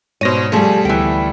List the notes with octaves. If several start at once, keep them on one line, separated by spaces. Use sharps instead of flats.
G#2 B2 C5 C#5 A#6 D#7
F3 G3 A3 G#4
D2 E3 B3 G5